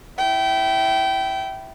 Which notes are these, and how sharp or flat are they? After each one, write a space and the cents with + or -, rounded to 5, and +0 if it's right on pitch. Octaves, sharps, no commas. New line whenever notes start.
E4 +0 G5 -25